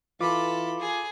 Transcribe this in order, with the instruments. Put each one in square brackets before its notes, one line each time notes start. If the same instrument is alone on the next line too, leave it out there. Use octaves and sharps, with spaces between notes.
[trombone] E3 [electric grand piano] F4 D6 [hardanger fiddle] A4 B5
[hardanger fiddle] G#4